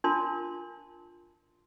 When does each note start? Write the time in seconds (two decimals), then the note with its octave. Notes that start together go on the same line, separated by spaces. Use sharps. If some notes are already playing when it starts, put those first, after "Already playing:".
0.04 D4 F4 A#4 A5 C6